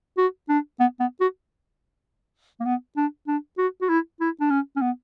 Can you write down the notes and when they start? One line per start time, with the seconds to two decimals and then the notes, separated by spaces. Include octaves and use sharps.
0.17 F#4
0.49 D4
0.80 B3
1.00 B3
1.21 F#4
2.60 A#3
2.65 B3
2.97 D4
3.27 D4
3.58 F#4
3.81 F#4
3.89 E4
4.20 E4
4.40 D4
4.50 C#4
4.76 C#4
4.82 B3